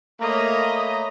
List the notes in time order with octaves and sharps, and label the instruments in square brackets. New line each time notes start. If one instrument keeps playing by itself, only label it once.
[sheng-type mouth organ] A3 A#5 [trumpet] A#3 [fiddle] C#5 B5 [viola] D#5